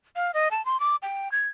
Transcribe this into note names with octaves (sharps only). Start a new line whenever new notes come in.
F5
D#5
A5
C6
D6
G5
G#6